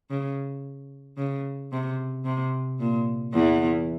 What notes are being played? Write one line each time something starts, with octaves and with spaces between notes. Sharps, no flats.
C#3
C#3
C3
C3
A#2
E2 E3